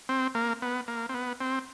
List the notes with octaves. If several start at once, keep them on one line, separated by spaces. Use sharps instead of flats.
C4
A#3
B3
A#3
C4
B3
C4